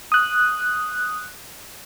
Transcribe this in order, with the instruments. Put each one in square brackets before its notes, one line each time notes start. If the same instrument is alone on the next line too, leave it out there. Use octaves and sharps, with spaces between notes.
[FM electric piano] D#6 F#6